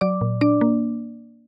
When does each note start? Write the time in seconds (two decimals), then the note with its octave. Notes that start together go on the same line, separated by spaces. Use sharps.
0.01 F#3 D5 D6
0.21 A#2
0.41 D4 D5 D6
0.61 A#3